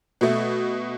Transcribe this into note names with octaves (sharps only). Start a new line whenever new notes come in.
B2 A3